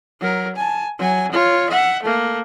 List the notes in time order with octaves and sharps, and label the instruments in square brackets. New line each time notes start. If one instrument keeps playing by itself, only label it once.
[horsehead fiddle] F#3 A#4
G#5 A5
F#3 G#5
F4 C#5
E5 F#5
A3 A#3